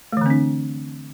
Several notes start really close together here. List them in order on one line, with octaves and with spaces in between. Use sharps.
A3 E3 D3 C4 D4